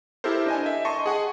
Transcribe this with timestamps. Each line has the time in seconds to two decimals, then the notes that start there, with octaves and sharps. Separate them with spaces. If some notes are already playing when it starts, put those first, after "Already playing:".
0.24 E4 G4 A4 A#4 C5
0.46 D4 D#5 G#5
0.66 E5
0.85 D#5 A5 C6 C#6
1.06 G#4 F#5 G#5